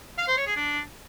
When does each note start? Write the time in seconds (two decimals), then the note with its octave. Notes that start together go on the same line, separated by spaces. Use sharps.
0.18 F5
0.28 C5
0.37 C#5
0.47 G#4
0.56 D4